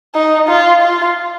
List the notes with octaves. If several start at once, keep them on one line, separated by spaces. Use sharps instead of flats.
D#4
F4
F4